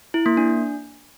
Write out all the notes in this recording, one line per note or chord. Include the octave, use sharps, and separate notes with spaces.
E4
A#3
D4